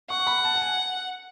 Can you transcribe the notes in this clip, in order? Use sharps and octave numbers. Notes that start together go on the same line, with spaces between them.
F#5 C#6
B5
A5
A5
G#5